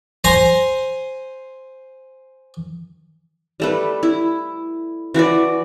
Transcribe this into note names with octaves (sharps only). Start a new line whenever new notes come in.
C5 G#5 A#5 C6
G3 A3 B4
E4
E3 F#4 B4 D5